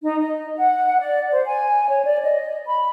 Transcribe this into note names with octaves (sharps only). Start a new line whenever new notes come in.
D#4
D#5
F#5
D5
C5
G#5
C#5
D5
D#5
B5